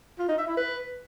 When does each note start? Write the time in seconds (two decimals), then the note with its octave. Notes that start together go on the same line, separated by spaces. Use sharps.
0.19 F4
0.29 D#4
0.38 E5
0.48 E4
0.57 B4